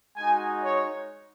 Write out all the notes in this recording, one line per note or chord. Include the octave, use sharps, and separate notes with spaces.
G#3 D#4 F#4 G#5
C#5